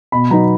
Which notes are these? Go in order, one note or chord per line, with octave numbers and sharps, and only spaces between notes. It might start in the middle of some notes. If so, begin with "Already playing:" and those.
B2 B5
F#3 B3 D#4 A#5